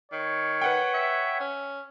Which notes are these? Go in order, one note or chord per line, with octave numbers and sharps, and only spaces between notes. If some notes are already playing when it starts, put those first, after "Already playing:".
D#3 C#5
B4 F#5 G5
E5
C#4